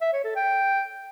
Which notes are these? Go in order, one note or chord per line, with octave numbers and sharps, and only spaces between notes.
E5
C#5
A4
G5